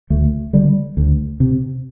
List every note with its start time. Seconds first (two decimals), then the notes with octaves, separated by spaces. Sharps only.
0.10 D2 A3
0.53 D3 G3
0.97 D2
1.40 C3